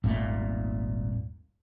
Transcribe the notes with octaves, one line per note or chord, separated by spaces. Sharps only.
D#1 G#1 A#2 A3